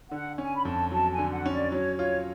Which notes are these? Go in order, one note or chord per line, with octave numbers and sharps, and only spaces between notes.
D3 F#5
C#4 G#5
B5
F2 A5
F#3 A5
G#5
D3
F#5
C#4
D5
F#3 C#5
F4 C#5